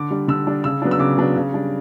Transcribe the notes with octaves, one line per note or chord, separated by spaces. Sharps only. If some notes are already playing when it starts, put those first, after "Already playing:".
Already playing: D3 D6
G3 D4
D3 E6
G3 D4
C#3 E6
F#3 B3 D4
E6
C#3 D6
F#3 B3 D4
C#3
G3 D4